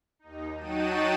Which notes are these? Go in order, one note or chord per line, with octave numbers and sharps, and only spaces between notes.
D#2 D#4
F#3 D#4 F#4 G5 A5 D#7